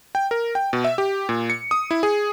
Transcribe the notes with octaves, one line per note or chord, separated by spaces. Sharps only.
G5
A#4
G5
B2
E5
G4
A#2
C#7
D#6
E4
G#4